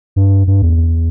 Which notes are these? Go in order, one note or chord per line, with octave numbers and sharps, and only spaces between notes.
G2
G2
E2